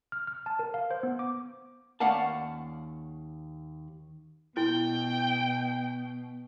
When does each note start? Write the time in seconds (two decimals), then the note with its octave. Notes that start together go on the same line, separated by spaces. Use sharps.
0.12 F6
0.27 F6
0.46 A5
0.59 A#4
0.74 F5
0.91 C5
1.03 B3
1.19 D6
2.00 D#2 C#4 D5 F5 F#5 A5
4.57 B2 E4 G5